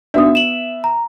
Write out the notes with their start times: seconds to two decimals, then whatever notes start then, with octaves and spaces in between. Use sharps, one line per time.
0.14 B3 D4 F#4 E5 D#6
0.35 E7 F#7
0.84 A#5